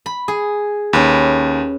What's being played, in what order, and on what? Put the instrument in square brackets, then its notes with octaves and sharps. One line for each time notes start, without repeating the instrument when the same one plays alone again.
[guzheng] B5
G#4
[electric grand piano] D#2 [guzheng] C#4 B4